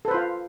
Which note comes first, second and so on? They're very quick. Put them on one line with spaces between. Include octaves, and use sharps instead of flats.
A4 B4 C5 F4 F5